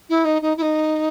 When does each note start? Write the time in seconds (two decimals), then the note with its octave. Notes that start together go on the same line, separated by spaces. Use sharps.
0.09 E4
0.25 D#4
0.42 D#4
0.57 E4
0.62 D#4